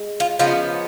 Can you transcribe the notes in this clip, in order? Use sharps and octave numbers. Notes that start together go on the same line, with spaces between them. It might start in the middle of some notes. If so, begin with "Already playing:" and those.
Already playing: G#3
F4
C#3 F3 B3 D#4 F4